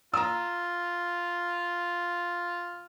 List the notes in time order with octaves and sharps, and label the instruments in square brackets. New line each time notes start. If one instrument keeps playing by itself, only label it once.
[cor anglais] F4 [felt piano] A#5 E6